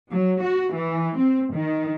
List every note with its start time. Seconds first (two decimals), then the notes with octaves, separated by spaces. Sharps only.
0.12 F#3
0.43 F#4
0.74 E3
1.19 C4
1.53 D#3